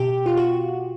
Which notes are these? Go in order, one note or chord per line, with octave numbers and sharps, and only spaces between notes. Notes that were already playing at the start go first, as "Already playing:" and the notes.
Already playing: B2 G4
F4
F#4